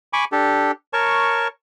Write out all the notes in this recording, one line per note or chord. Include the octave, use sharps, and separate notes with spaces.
G#5 B5 C#6 D6
D4 G4 A4
A#4 C#5 A5 C#6